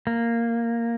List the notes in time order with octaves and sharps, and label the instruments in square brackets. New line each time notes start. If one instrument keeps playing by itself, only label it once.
[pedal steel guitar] A#3